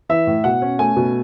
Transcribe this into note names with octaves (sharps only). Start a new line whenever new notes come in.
E3 E5
A2
B2 F#5
C#4
A3 G#5
B2